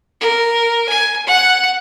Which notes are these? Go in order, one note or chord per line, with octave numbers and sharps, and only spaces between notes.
A#4
G#5
F#5